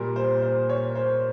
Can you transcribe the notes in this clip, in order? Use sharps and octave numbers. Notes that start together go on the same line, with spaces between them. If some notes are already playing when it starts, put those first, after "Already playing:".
Already playing: A#2 G3 A#4
C5
C5
C#5
C5